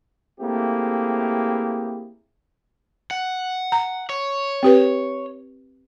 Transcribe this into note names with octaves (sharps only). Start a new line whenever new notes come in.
A3 A#3 C4 E4 G4 G#4
F#5
A#5
C#5
C4 G4 B4